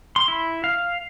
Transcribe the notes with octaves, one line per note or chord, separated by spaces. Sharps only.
C6
E4
F5